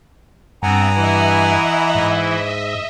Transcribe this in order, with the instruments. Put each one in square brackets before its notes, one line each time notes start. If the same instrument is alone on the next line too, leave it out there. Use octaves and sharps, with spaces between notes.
[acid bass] G2 [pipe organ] B3 C4 [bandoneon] F#5 G#5 A#5
[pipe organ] E3 E4 [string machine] D#5 E5
[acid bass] G#2